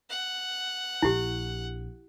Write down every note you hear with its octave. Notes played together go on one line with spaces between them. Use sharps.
F#5
A#1 D4 E4 G4